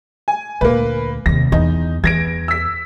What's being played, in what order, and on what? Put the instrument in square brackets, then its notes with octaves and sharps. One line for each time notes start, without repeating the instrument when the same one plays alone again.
[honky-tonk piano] G#5
[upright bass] D2 A#2 [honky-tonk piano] A#3 B4
[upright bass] D#2 C3 [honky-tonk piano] A#6
[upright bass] E2 [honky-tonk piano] D#4
[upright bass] E2 [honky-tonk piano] G#6 A#6 D7
[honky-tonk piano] E6 B6